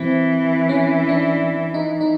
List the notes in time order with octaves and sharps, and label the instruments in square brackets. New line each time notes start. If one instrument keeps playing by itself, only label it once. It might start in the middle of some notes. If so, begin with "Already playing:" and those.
Already playing: [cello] E3 [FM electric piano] C4
[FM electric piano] C#4
D4
D#4
D#4